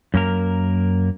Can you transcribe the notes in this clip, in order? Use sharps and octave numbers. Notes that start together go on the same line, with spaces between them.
F#2 A#3 A#4